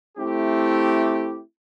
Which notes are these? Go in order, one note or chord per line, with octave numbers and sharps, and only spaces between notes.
A3 C4 E4 G4